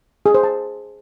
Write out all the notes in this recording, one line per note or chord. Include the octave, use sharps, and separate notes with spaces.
G#4
C5
A5